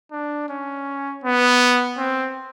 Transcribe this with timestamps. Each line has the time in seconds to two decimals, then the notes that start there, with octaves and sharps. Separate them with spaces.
0.11 D4
0.49 C#4
1.24 B3
1.98 C4